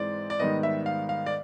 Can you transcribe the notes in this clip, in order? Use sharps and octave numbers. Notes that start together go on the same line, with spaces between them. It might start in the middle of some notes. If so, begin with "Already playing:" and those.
Already playing: G#2 E3 G#3 C4 D5
D5
G#2 D#3 G3 B3 D#5
E5
F5
F5
D5